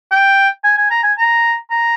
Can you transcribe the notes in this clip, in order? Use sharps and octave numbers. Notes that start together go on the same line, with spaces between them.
G5
G#5
G#5
A#5
G#5
A#5
A#5